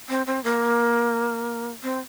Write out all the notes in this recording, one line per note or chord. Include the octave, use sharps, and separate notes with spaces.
C4
C4
A#3
C4